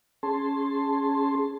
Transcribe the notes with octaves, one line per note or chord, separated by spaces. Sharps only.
C#4 G#4 A5 C6